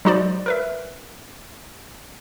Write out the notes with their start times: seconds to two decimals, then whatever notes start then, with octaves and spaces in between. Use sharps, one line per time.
0.05 F#3 G#3 D#4 F#4 C5 D5
0.46 A#4 B4 E5